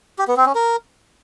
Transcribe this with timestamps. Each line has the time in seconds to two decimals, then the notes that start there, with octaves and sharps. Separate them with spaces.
0.19 G4
0.28 B3
0.37 C4
0.46 C#4
0.55 A#4